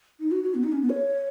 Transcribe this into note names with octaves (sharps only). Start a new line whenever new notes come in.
D#4
F#4
F#4
B3
D#4
C#4
B3
C#5